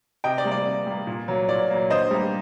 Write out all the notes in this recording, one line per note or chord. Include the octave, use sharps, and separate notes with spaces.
C3 D#5 G5
D5
G3 A#3
D5
C3
G3 A#3
A#2
F#3 A#3
A#2 D5
F#3 A#3
D3 C5 D#5
G3 A#3